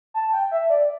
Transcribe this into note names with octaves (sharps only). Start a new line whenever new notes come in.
A5
G5
E5
D5